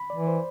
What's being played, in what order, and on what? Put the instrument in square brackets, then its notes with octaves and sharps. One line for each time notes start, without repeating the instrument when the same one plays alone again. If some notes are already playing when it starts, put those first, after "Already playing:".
Already playing: [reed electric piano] B5
D5
[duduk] E3
[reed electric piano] C5